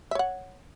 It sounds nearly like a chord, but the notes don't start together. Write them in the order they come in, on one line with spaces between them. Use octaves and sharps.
E5 C#5 F#5